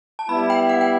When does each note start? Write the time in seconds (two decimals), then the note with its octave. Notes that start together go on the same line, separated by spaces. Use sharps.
0.19 A5
0.29 G3 B3 E4 B5
0.50 G5
0.69 F#5
0.81 G5